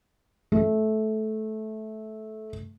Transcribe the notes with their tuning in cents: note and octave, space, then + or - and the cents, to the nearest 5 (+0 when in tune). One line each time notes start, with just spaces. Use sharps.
A3 -15